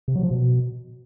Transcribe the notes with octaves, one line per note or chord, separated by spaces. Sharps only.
C3
F#3
F3
B2